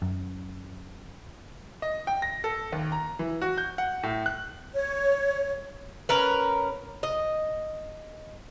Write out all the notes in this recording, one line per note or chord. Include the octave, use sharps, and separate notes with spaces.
F#2
D#5
G5
A#6
A4
D#2
A#5
E3
F#4
G6
F#5
A2
F#6
C#5
C#4 A#4 B4
D#5